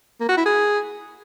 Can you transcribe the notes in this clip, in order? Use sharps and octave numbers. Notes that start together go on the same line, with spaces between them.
A#3
F#4
E4
G#4